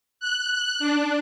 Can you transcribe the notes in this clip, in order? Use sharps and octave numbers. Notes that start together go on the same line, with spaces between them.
F#6
D4